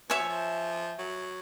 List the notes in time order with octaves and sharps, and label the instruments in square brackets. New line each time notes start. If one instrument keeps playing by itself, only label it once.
[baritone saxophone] B2 [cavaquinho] C#5 E5 G#5 C#6
[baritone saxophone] F3
F3
F#3